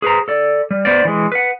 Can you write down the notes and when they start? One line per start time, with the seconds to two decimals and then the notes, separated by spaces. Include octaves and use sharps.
0.02 G#4 B4 C5 A#5
0.28 A4 D5
0.71 G3
0.85 B3 C5 D5
1.05 E3 G#3
1.32 B4 F#5